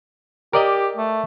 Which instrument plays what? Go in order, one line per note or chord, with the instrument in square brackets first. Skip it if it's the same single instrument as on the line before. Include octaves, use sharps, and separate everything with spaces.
[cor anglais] G4 [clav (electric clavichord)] A#4 D5 D#5
[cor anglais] A3